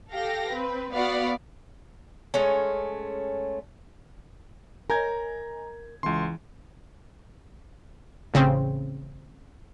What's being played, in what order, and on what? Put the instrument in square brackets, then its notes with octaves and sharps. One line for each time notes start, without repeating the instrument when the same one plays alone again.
[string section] G4 A4 F5 G5 A#6
C4 B4
B3 F#4 D5 F5 F#5 B5
[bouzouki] G#3 A3 C#4
[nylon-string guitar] A#4 [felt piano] C#5 D#5 G#5 [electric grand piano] A#5 G6 G#6
[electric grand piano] C#2 C6 [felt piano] E3
[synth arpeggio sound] A1 C#3 C4